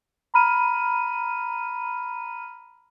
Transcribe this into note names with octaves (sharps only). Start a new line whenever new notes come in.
A#5 B5 F6 D#7